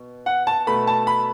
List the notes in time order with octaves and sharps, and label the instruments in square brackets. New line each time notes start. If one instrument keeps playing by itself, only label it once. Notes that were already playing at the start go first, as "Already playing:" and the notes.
Already playing: [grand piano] B2
F#5
A5
B2 A3 B5
A5
B5